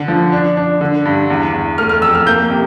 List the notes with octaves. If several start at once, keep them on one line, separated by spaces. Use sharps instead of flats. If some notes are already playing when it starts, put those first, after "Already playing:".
Already playing: D3
F3
D4
D4
D3
G2
E2
E2
A3 F6
F6
F2 E6
F6
A#3 G6
C3